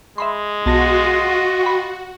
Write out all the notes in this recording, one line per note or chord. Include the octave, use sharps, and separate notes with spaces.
G#3 E5 B5 C6
B1 F4 F#4 D#5 A5 A#6
G5 B5